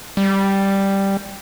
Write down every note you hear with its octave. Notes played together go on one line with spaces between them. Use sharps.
G3